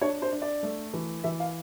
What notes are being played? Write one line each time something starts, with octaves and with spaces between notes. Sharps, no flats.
D4 C#5
C5
D4
D5
A3
E3
E3 E5
F5